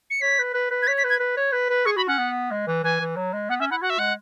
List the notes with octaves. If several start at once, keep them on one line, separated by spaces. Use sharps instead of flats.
C#7
C#5 B6
B4
B4
B4
G#6
C#5 B6
B6
B4
G#6
B4
C#5
B4
B4
G#4 C#6
F#4 B5
C#4 F#5
B3
G#3
E3
E3 G#5
E3
F#3
G#3
B3 F#5
C#4 E5
E4 F#5
F#4 F#5
E5
G#3 F#5